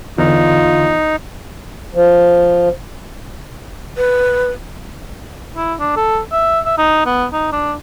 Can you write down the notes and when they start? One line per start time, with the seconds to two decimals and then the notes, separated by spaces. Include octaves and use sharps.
0.18 E2 D3 D#4 F4
1.95 F3
3.97 B4
5.56 E4
5.79 D4
5.96 A4
6.32 E5
6.65 E5
6.78 D#4
7.06 B3
7.33 D#4
7.52 D4